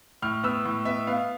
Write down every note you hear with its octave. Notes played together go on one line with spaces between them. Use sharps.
A2 F6
B3 E6
A2
B3 E5
B3 F5